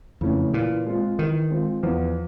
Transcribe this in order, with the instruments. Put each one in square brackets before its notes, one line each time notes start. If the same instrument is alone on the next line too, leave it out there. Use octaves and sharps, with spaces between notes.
[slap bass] F2 [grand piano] C#3 E3 A3 C#4
[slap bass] A#2 [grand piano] E3
[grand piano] G#3 C4 F4
[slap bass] D#3 [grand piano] E3
[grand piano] G#3 C4 F4
[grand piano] E2 [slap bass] F3